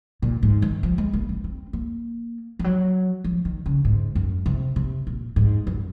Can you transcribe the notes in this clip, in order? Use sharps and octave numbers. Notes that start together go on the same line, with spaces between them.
A#2
G#2
D#3
F3
G#3
A#3
C4
C4
A#3
F3
F#3
F3
D#3
C#3
G#2
F#2
C3
C3
A#2
G#2
F#2